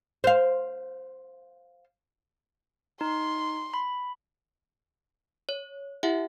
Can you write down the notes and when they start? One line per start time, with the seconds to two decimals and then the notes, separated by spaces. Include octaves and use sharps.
0.24 C5 F5
3.01 D#4 C6
3.74 B5
5.49 C#5
6.03 E4 G4 E5 F#5